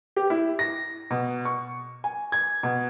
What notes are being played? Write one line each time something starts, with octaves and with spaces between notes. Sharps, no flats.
G4
E4
A#6
B2
C#6
G#5
G#6
B2